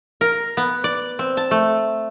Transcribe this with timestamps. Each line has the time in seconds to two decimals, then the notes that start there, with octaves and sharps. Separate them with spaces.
0.21 A#4
0.57 B3
0.84 D5
1.19 C4
1.37 A5
1.51 A3